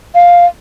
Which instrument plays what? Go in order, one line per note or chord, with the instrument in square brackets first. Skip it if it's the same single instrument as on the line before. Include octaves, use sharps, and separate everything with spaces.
[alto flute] F5